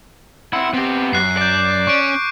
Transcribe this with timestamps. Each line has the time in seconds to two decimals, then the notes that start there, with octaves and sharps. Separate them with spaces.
0.53 C4 E4 F#5
0.74 B3 C4 G4
1.13 F#2 F#6 C7
1.37 D5 D6 G6
1.87 C#4 C#6 D7